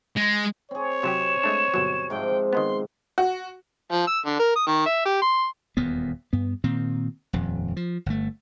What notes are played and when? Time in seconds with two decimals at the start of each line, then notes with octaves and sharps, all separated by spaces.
0.17 G#3
0.71 C4 G#4 C#5
1.03 C3 F#3 G4 E7
1.44 G#3 A3 D4
1.74 G1 B2 F#3
2.10 G#2 C3 F3 G5
2.53 D#3 G#3 B3 C6
3.18 F#4
3.92 F3
4.07 E6
4.26 D3
4.39 A#4
4.56 D#6
4.67 D#3
4.86 E5
5.06 G4
5.22 C6
5.77 D#1 E2 A#2 B3
6.33 G2 B3
6.64 A#2 D#3 C4
7.33 D#1 F2
7.76 F3
8.06 G1 A3